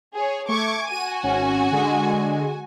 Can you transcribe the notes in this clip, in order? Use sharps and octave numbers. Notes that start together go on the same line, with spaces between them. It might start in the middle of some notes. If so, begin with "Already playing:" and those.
G#4 C#5
A3 C#6 D6 G#6
F#4 G#5 D#7
G#1 C#4
D3 G#3